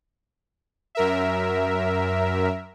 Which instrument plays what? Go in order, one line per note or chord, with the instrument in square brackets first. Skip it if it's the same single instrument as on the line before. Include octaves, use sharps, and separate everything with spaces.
[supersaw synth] F#2 A#4 E5